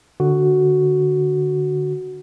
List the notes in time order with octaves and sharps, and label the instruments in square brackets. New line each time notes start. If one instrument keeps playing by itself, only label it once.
[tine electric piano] D3 F#4